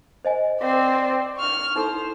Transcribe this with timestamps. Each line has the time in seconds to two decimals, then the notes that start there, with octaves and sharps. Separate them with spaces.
0.25 C5 D#5 G#5
0.61 C4 D5
1.37 C#6 F6
1.76 D#4 E4 A4 C5